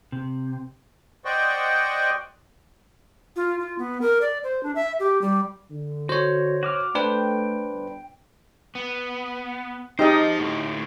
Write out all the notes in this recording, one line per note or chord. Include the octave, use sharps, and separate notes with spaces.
C3
C5 D5 D#5 F#5 G5 C#6
F4
F4
B3
A#4
D5
C5
D4
E5
G4
G3
D3
F#4 C5 C#5
F#4 D6 F6
A3 D4 B4 C5 G5
G1
B3
D#4 G4 C5 D#5 A5
A2 D3 A3